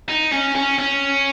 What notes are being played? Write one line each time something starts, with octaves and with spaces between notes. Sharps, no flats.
D#4
C#4
C#4
C#4